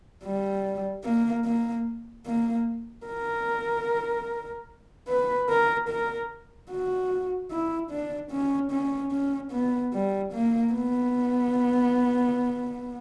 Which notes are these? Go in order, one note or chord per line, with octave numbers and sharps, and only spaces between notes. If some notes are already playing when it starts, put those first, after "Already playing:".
G3
A#3
A#3
A#3
A#4
B4
A#4
A#4
F#4
E4
D4
C#4
C#4
C#4
B3
G3
A#3
B3